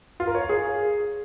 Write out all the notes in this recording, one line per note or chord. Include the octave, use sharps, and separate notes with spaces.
F4
A#4
C#5
F5
G#4